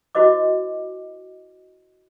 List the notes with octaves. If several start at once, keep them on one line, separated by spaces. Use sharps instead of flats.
E4 F#4 C5 D#5 D6